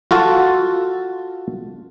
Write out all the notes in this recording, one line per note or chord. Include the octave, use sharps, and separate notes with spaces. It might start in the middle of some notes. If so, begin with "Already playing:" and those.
F4 F#4 A4 A5